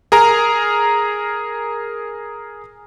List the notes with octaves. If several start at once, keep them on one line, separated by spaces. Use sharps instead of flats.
G#4 A#4 A#5